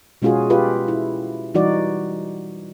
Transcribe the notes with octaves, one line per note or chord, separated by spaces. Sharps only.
B2 G#3 C#4 F4 F#4 G#4
F4 G4 B4
E4
E3 G3 D#4 F#4 D5